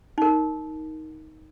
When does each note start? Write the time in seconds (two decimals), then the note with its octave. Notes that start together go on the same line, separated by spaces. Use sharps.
0.18 D#4 A#4